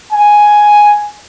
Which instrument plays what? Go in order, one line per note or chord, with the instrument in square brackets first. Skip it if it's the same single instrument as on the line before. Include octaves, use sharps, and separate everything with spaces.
[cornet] G#5